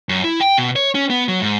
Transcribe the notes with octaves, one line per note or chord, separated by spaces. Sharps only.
F#2
E4
G5
B2
C#5
C#4
B3
F#3
G#2